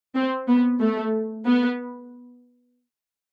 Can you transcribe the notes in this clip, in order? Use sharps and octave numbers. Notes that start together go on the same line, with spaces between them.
C4
B3
A3
B3